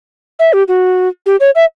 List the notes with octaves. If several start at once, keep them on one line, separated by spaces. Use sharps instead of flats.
E5
G4
F#4
G4
C#5
E5